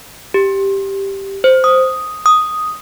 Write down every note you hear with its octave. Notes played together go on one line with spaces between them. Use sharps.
G4
C5
D#6
D#6